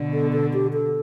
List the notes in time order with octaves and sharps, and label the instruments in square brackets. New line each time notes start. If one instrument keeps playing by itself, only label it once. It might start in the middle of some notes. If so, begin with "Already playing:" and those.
Already playing: [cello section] B2 D3
[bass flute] A4
A4
G4
A4